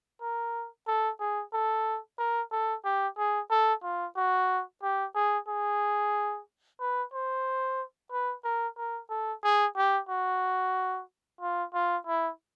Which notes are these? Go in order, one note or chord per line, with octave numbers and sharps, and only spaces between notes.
A#4
A4
G#4
A4
A#4
A4
G4
G#4
A4
F4
F#4
G4
G#4
G#4
B4
C5
B4
A#4
A#4
A4
G#4
G4
F#4
F4
F4
E4